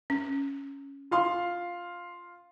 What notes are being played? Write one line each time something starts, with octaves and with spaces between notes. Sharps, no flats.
C#4
F4 F5 C6